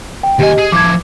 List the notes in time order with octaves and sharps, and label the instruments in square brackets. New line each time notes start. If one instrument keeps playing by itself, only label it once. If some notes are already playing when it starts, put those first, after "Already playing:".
[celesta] G5
[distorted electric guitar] D#2 G#5 [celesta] G4 D#5
[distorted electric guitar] G#4
[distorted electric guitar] F3 E4 [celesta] D6 G#6